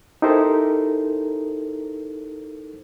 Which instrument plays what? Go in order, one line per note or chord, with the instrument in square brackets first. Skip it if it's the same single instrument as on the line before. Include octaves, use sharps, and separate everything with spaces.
[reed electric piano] D#4 E4 G4 A4 A#4 C5